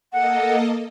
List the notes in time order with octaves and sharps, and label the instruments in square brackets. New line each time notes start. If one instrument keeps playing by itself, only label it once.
[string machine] A#3 A4 D#5 [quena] F#5